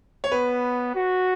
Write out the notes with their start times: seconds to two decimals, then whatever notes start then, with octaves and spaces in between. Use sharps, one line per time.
0.24 C#5
0.32 B3 B4
0.95 F#4